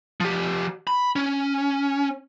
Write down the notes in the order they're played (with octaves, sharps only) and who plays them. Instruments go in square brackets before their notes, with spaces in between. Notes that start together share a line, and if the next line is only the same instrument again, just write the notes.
[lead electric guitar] F3 G4
B5
C#4